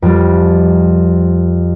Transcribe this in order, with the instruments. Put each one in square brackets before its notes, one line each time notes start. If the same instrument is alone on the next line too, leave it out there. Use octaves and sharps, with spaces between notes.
[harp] F2 G3